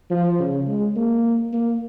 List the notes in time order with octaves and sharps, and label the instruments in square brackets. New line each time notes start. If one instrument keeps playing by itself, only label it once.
[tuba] F3
C#3
G#3
A#3
A#3